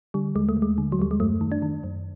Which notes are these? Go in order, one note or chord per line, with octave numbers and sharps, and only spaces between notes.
D3 G3
D#2 G#3
A3
D#2
G#3
D3
F#3
D#2 G3
G#3
F#2 A3
D#3
D4
D#3
F#2